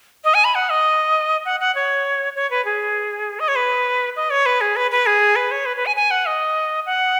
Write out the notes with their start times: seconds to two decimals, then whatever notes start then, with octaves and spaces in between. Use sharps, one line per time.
0.24 D#5
0.34 G#5
0.44 B5
0.55 F#5
0.70 D#5
1.45 F#5
1.60 F#5
1.75 C#5
2.35 C#5
2.51 B4
2.65 G#4
3.40 D#5
3.48 C#5
3.56 B4
4.16 D#5
4.30 C#5
4.46 B4
4.61 G#4
4.76 B4
4.91 B4
5.06 G#4
5.36 B4
5.51 C#5
5.66 B4
5.77 B4
5.86 G#5
5.96 G#5
6.11 F#5
6.26 D#5
6.86 F#5